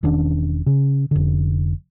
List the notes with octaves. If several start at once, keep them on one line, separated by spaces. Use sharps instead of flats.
E1 D#3 C#4 D4
C#3
F1 D3